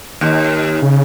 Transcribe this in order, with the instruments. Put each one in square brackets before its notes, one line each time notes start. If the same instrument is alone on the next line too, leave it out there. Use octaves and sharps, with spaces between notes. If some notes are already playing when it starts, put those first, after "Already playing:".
[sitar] D#2
[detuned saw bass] C#3